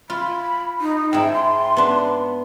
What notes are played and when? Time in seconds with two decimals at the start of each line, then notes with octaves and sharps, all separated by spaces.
0.10 F4 B5
0.81 D#4
1.13 G#2 E4 G5
1.33 C6
1.77 B3 D4